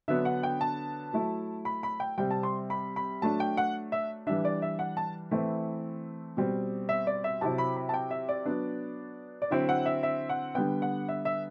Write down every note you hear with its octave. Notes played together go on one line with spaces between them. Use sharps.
D3 F#3 B3 D4 E5
F#5
G5
A5
F#3 A3 E4
B5
B5
G5
C3 G3 C4 G5
A5
C6
B5
B5
F#3 A3 D4 A5
G5
F#5
E5
E3 G3 D4 E5
D5
E5
F#5
A5
E3 A3 C4 E4
B2 G3 C4
E5
D5
E5
C3 F#3 C4 E4 A5
B5
B5
A5
G5
E5
D5
F#3 B3 D4
D5
D3 F#3 C4 E4 E5
F#5
E5
E5
F#5
D3 G3 B3 G5
F#5
E5
E5